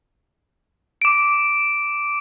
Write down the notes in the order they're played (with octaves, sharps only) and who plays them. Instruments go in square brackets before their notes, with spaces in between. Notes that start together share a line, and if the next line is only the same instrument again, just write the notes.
[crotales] D6 D7